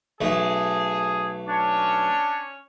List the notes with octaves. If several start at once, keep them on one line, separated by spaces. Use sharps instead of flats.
B1 A3 G#4 D#5
C#4 D4 C#5